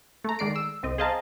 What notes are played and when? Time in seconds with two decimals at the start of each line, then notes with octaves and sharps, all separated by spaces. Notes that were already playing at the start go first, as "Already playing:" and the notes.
0.24 A3 A#5
0.39 D#3 G#3 D5 C7 D7
0.56 E6
0.83 C2 C4 D#5
0.98 G#4 C5 D#5 F5 A5 A#5